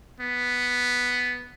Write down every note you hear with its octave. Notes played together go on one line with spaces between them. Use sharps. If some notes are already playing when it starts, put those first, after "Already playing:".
B3